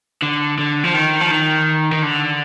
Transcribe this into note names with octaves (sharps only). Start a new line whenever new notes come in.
D3
D3
F3
D#3
F3
D#3
D#3
D3